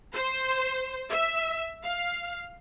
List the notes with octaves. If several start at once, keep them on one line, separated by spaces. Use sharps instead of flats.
C5
E5
F5